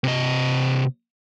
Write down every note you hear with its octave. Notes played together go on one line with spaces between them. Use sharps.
C3 D#5